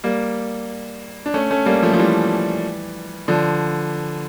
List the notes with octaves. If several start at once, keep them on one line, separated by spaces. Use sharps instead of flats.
G3 A#3
D4
A3 C#4
A3 C#4
G3 A#3
F3 A3
F3
E3 G3
D3 F3